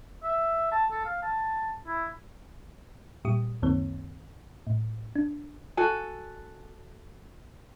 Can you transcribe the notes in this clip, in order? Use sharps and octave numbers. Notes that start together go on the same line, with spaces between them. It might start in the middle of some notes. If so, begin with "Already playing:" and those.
E5
A5
A4
F5
A5
E4
A#2 G3 G4 D#6
C#2 F#2 D#3 A#3 C4 C#5
A2
D4
F#4 A4 G#5